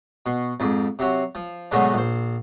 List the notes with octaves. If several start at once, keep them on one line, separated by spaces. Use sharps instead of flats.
B2
F2 G#2 B5 D6
C3 F#3
F3
G#2 B2 D3 F#3 G#3 A3
A#1 C5